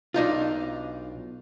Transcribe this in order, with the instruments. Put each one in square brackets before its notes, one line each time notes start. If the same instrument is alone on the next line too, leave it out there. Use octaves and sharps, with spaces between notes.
[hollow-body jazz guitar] B1 D4 D#4 F4